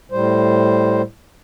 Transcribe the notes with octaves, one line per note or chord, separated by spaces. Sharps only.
A2 G3 C5